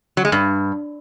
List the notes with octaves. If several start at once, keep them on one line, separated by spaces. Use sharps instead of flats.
F#3
G#3
G2